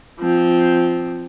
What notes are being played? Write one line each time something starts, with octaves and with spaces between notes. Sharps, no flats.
F3 C4